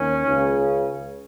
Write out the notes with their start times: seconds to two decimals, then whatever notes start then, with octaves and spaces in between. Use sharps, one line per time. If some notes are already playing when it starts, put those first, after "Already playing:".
Already playing: D#2 C#4
0.27 C#2 C#3